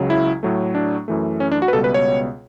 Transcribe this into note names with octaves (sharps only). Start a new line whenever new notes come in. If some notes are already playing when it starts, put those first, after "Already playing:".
Already playing: C#2 C#3 F#3
E4
A2 F#3 A3
D4
F#2 E3 A3
C#4
D4
F#4
B4
C#2 B2 G3 B3 A4
B4
C#5